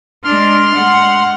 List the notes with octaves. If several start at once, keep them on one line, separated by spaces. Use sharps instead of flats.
G#3 D4 C6 F6
G#3 F#5